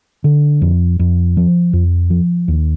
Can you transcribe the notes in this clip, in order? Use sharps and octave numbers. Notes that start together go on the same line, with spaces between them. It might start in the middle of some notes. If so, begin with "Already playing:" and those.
D3
F2
F2
F3
F2
F3
D#2